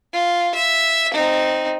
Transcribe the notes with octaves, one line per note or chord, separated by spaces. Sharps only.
F4
E5
C4 D#4